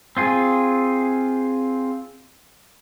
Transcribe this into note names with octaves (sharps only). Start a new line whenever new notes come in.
C4 F4 G#4